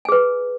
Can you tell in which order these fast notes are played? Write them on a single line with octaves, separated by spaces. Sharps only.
G#5 G#4 B4